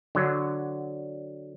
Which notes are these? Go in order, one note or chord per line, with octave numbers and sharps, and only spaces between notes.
D3 F#3